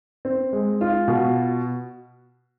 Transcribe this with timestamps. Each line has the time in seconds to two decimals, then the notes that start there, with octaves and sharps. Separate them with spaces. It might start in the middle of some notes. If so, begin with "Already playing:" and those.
0.25 C4
0.53 G#3
0.81 F4
1.08 B2